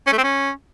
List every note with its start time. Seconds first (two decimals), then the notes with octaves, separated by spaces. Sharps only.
0.07 C#4
0.12 A3
0.18 C4
0.24 C#4